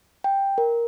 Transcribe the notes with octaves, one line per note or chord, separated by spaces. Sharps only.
G5
A#4